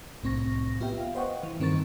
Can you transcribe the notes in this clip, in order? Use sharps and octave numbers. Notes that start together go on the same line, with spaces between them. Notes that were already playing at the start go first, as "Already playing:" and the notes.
C2 A2 C4 C#6 A#6
B3 F4 G4 E5 G5
F5
B4 C5 D#5 F#5 G5 C#6
E3
G2 D#3 C4 A#4 C#6 A6